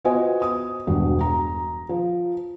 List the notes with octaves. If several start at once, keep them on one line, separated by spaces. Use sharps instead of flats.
B3 F4 F#4 C5 D#5 G#5
D#6
E1 G2 F#4
A#5
F3